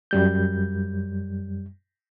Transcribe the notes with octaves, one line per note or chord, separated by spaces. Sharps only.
F#2 G3 G6